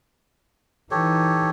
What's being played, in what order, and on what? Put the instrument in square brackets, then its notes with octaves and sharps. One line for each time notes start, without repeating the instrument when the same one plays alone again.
[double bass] E3 D#4 [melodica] G4 A4 C#5